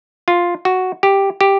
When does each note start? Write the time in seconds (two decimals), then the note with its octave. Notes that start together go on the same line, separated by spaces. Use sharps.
0.28 F4
0.65 F#4
1.03 G4
1.41 G4